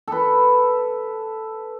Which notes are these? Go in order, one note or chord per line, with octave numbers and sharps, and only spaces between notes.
A4 B4